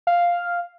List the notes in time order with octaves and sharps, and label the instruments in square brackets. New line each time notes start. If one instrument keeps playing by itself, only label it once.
[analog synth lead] F5